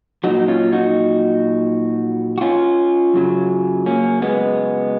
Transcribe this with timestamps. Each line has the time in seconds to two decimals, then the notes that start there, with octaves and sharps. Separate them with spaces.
0.24 A#2 F#3 D#4 F#4
0.48 C#4 F4
0.72 D#4 F#4
2.38 F#4
2.41 C#4 F4
3.14 F#2 C#3 F#3
3.86 A#3 C#4
4.22 G#3 B3